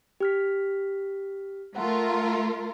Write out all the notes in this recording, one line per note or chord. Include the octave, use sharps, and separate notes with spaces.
G4 F6 B6
A3 F4 A#4 F#5